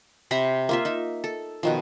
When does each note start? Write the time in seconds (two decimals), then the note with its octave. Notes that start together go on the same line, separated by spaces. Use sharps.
0.31 C3 A#5 B5
0.69 A#3 F4 E5
0.85 D#4 E5
1.24 A4
1.63 B2 D#3 F3